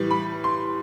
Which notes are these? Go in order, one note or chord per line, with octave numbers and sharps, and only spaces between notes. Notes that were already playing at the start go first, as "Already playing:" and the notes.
Already playing: A2 E3 G3
B5
C6